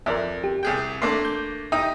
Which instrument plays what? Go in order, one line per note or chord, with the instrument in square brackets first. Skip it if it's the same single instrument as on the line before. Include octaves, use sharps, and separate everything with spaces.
[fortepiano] F2 [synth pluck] A#4 D5 E5
[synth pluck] G4
[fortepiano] C2 G#4 G5
[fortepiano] A3 A#3 D4 [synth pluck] C6
[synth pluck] G6
[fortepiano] D#4 G4 [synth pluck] E5 G5 D#6